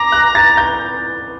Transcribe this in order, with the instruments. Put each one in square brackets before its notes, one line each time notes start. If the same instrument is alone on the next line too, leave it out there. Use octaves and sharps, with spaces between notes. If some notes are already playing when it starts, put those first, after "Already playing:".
Already playing: [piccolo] A#5 [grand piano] D6
[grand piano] F#6
A6
G6